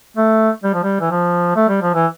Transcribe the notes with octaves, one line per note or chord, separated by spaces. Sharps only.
A3
G3
F3
G3
E3
F3
A3
G3
F3
E3